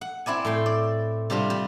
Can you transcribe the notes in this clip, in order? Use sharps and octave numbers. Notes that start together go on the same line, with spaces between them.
F#5
C4 E4 D5 G#5
A2 G5 C6
D5
C3 G3 D4 F4
G3